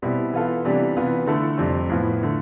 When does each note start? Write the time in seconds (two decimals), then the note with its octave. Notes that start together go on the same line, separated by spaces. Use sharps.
0.02 B2 G3 C4 E4
0.33 E3 B3 F4 A4
0.64 C3 E3 G3 B3 D4
0.96 C3 E3 B3 F4
1.26 D3 A3 E4 A4
1.58 F2 C3 G3 C4
1.90 A2 F3 B3
2.23 D3 A3